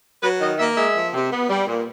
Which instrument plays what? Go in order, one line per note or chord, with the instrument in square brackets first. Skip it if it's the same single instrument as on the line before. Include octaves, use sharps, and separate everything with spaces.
[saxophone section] F#3 B4
D#3 D#5
A#3 E5
G#3 E5
F3
C3
B3
G3
A#2